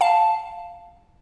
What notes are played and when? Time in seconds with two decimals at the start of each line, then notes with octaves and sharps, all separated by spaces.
0.01 F5 A5